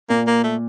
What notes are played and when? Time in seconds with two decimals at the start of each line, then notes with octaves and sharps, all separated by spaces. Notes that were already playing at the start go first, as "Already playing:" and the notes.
0.10 A#2 A#3
0.27 A#3
0.44 A3